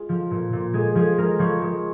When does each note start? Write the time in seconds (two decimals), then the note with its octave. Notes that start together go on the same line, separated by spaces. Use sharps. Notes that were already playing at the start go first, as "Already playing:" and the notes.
Already playing: G#3 F4
0.09 F3
0.31 A#2
0.53 A#2
0.73 G#3 G#4
0.95 F3 G#4
1.18 G#3 A#4
1.39 F3 C#5
1.62 G#3